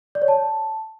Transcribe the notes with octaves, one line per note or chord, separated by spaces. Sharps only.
D5
C#5
A5